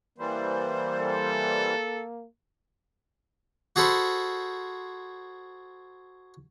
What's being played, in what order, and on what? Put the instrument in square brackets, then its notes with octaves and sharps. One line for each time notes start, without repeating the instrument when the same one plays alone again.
[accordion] E3 G3 [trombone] A#3 [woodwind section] C5
[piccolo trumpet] A4
[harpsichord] F#4 G#4 A4 C5 B5